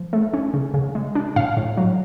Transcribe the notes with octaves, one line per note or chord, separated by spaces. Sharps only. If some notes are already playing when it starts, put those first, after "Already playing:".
Already playing: F3
A3
C#4
C#3
C#3
G#3
D4
A2 F5
A2
F#3